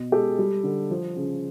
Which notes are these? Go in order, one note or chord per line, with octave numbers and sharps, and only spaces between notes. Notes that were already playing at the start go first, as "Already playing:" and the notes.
Already playing: B2
G#3 G4 A4
G3
D3
F3
C#3